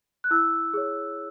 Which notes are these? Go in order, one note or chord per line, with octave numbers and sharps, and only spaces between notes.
F#6
E4 E6
G#4 C#5